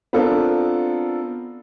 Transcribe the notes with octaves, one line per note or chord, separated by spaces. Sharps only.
B3 C4 D4 F4 A4 A#4